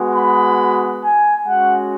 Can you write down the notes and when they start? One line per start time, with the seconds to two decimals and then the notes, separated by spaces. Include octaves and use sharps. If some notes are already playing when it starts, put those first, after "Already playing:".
Already playing: G#3 B3 F#4
0.15 B5
1.03 G#5
1.46 G#3 C#4 F#4 F#5